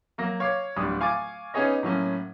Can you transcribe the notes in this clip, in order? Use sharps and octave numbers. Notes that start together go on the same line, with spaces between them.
F#3 A#3 A#6
C#5 F5 D6 C7
D1 G3 D4 D#6
F5 G#5 C#6 D6 A6
B3 C#4 D#4 G#4 C#5 D#5
A2 F#3 A#3 C#4